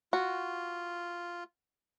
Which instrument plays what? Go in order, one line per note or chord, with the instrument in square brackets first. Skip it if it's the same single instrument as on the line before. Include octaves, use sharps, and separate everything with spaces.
[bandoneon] F4 [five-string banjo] F#4